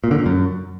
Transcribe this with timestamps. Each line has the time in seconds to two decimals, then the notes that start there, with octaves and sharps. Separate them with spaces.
0.04 A#2
0.11 D3
0.18 A#2
0.26 F#2